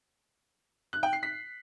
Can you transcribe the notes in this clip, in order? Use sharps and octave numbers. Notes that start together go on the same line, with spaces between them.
F#6
G5
C7
B6